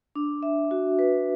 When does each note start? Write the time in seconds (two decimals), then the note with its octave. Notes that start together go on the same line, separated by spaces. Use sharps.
0.15 D4
0.43 E5
0.71 F#4
0.99 B4